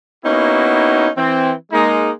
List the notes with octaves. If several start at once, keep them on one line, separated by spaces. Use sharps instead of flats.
A#3 B3 C#4 D#4 E4 F#4
E3 C4
G#3 A#3 D#4